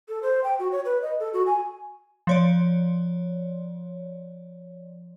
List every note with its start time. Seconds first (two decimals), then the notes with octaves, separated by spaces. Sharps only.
0.09 A4
0.23 C5
0.44 G5
0.59 F#4
0.72 C#5
0.85 B4
1.02 D#5
1.20 A4
1.33 F#4
1.46 G#5
2.27 F3 C#5 D5